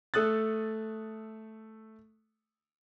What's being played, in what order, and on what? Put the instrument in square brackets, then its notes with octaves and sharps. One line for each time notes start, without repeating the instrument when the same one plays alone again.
[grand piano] A3 A4 D#6 F#6 A6